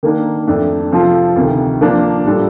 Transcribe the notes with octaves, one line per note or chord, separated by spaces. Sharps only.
D#3 A#3 D4
F2 D3 A3 D4
C3 F3 C4 F4 A4
D2 C3 D#3
D3 F3 A#3 D4
A2 G3 D4 F4 A4